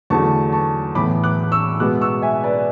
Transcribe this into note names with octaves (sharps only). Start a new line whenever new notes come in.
E2 D3 F#3 A3 A5 C#6
A5 C#6
A2 E3 B3 B5 D6
D6 F#6
C#6 E6
B2 G#3 B3 D6 F#6
C#6 E6
E5 G#5
B4 D5